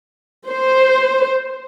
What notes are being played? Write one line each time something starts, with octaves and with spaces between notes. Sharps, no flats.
C5